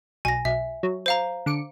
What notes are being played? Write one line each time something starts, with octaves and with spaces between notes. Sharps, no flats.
B1 G#5 A#6
B1 E5
F#3
C5 F5 A#5
D3 D6 C#7